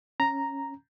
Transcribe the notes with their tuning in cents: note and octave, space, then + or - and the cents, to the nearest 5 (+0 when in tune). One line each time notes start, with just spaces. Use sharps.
C#4 -5 A#5 +0